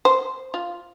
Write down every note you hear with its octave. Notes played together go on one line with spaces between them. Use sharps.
C5
F4